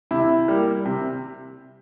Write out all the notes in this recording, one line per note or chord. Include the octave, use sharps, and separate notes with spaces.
C3 E4
G3 A#3
C3